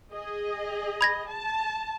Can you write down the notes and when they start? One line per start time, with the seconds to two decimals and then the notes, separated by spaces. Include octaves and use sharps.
0.13 G#4 D#5
1.01 B5 G#6 A#6
1.30 A5